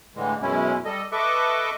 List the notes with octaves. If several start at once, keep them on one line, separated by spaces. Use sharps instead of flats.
A2 D3 E3 G#3
F#2 B2 G#3 C#4 E4
G3 A4 D#5
A4 B4 D#5 E5 C#6 D6